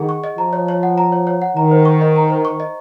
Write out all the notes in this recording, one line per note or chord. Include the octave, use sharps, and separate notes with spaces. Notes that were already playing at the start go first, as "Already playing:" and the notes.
Already playing: D#3 G#4 D#5 F#5
C#6
D#5
F3 A#5
C#5
C#5
F#5
A#5
C#5
C#5
F#5
D#3 A#5
C5
C#6
D#5
A#5
C5
C#6
D#5